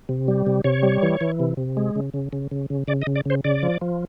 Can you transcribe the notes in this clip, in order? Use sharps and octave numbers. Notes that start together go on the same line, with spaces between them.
C3
G3
C3
C3 C#5
G3
E3
E3
C3
C3
G#3
C#3
C#3
C#3
C#3
C#3
C#3 D5
D#5
C#3
D5
C#3 C5
C#3 D5
F3
F3